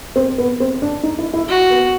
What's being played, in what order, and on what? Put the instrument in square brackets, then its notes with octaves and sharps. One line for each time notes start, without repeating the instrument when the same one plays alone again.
[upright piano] C4
B3
C4
D4
D#4
E4
E4
[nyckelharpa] F#4
[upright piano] B3